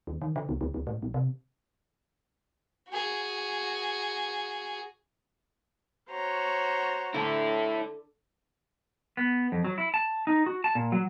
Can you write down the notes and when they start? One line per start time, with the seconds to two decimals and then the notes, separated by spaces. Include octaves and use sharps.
0.07 D#2
0.22 D#3
0.36 D3
0.49 C#2
0.61 D2
0.74 D2
0.87 A2
1.02 A#1
1.14 C3
2.90 F#4 G#4
6.10 F#4 C5 C#5 A#5
7.14 D3 E4 A4
9.17 B3
9.52 F2
9.65 F#3
9.78 E4
9.94 A5
10.27 D#4
10.46 F#4
10.64 A5
10.75 A#2
10.92 F#3